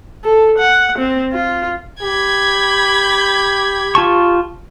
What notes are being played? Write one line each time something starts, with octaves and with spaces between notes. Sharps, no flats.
A4
F#5
C4
F4
G4 B5 G#6
F4 A5 C#6